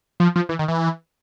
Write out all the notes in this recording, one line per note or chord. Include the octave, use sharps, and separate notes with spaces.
F3
F3
E3
D#3
E3